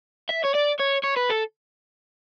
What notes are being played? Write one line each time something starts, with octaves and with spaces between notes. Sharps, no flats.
E5
C#5
D5
C#5
C#5
B4
A4